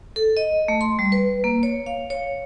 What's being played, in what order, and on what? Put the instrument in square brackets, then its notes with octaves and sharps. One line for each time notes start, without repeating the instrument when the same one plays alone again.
[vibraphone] A4
D#5
A3
C6
G3
B4
A#3
C#5
F5
C#5